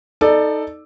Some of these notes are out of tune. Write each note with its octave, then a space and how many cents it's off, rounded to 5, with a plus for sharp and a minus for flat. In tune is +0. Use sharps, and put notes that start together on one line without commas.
D#4 +5 A4 +0 D5 +20